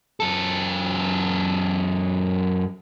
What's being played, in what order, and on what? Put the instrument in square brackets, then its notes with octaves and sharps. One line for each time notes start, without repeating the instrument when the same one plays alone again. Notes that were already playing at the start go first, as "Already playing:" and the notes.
[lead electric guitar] F#2 A4